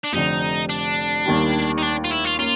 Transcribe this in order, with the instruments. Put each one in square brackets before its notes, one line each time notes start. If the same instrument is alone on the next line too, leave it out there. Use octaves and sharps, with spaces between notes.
[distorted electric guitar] D4
[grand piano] F1 F2 D3 [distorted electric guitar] D#4
[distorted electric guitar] D4
[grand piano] D#2 D#3 G3
[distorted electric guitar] D#4
D4
F4
E4
F4
[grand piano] A#3 C#4 [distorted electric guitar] F4